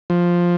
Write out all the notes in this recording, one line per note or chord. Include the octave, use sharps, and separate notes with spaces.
F3